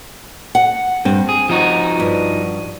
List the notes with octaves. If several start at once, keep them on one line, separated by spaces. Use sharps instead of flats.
F#5
G2 C4
G#4
F3 D#4 F#4
G2